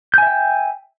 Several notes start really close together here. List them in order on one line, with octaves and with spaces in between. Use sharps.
G6 G#5 E5 G5